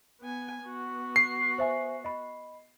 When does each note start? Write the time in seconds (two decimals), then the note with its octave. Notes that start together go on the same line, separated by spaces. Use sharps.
0.21 B3 G#5
0.63 B3 F#4
1.16 C7
1.58 C5 E5 G#5
2.04 D#5 B5